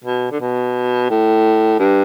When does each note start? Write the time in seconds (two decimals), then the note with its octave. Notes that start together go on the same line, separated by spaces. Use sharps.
0.04 B2
0.31 D3
0.40 B2
1.10 A2
1.79 G2